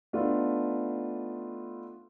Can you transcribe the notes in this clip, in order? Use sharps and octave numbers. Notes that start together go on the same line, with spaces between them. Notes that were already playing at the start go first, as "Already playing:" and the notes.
A3 B3 D4 D#4 F4